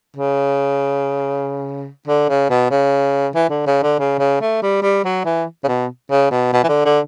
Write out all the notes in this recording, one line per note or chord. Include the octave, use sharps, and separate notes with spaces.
C#3
D3
C#3
B2
C#3
E3
D3
C#3
D3
C#3
C#3
A3
G3
G3
F#3
E3
C#3
B2
C#3
B2
B2
E3
D3
D3